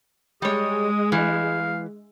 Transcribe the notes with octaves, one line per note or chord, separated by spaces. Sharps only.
G3 G#3 C#5 D#6
E3 F5